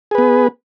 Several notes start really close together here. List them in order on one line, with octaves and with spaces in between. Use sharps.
G#4 B4 B3